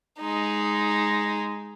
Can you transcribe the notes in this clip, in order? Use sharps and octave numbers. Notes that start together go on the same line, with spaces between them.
G#3 D#4